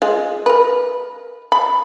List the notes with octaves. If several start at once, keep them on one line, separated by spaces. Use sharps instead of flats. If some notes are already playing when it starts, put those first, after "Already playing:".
G#3 F4
A#4 B4
B5